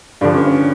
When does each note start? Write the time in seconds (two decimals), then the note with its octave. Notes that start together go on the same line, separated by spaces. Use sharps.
0.21 G2 D3 F3 D4
0.34 C#4
0.47 C#4